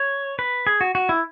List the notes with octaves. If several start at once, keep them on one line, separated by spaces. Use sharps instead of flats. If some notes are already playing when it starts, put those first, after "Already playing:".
Already playing: C#5
B4
G#4
F#4
F#4
E4